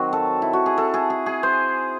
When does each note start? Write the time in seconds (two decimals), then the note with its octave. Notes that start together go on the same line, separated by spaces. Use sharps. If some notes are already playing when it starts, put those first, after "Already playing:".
Already playing: D#3 F#3 C4 F#4
0.13 A4
0.42 E4
0.53 F#4
0.66 G#4
0.78 A4
0.94 G#4
1.10 G#4
1.26 G#4
1.43 C5